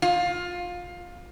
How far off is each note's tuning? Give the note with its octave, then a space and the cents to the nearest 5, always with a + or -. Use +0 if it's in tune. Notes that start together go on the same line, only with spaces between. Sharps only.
F4 +20